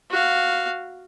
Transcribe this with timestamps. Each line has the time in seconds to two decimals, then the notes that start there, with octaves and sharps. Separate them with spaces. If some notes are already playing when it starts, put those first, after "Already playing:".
0.10 F#4 F5